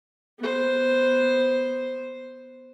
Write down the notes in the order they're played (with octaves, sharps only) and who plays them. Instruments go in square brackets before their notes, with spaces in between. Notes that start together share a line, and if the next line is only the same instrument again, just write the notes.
[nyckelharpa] B3 C5